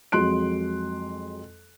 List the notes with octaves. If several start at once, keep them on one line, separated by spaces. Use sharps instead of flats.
F2 F#3 G#3 C6 F#6 D7